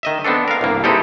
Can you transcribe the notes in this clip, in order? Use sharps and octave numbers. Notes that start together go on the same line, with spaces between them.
D#3 D#5 E5
B3 C4 D4 A4
A#4 F5
C2 G2 A#3
G#3 C4 D#4 E4 G4 A4